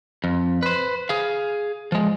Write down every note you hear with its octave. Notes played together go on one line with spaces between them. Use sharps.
F2
B4 C5
G#4 F5
F3 G#3